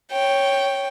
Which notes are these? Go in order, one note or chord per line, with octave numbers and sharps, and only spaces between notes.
C#5 G5